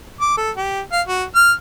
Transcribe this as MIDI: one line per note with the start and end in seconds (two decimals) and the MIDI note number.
0.21 0.35 86
0.37 0.51 69
0.57 0.81 67
0.92 1.02 77
1.06 1.24 66
1.35 1.52 89